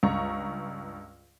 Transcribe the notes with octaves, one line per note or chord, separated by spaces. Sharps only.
C#2 G2 A#5 C#6